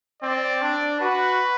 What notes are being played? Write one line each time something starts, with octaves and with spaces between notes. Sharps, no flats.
C4 D5
D4
F#4 B4